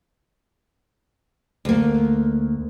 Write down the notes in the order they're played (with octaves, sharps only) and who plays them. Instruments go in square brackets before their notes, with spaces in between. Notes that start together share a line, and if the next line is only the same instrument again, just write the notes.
[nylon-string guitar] D2 A#3